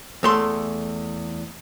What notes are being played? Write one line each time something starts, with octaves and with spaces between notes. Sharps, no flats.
E2 A3 C6